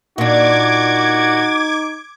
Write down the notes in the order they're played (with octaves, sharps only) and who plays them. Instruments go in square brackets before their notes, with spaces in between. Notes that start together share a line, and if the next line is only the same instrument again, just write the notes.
[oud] A#2 D4 [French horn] D#4 [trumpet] F#4 [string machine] D6 G#6